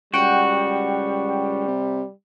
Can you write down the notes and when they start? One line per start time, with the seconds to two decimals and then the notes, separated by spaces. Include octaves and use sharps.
0.14 C#2 G3 F#4 F#5 G5
1.67 C3